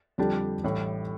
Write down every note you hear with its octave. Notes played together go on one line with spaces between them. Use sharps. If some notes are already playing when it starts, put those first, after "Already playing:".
F2 D3 G3 D4 G4
A1 A2 G3